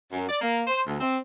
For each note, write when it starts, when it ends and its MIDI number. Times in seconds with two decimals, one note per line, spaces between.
0.12 0.27 42
0.29 0.41 74
0.41 0.62 58
0.67 0.81 72
0.87 0.97 38
1.00 1.18 60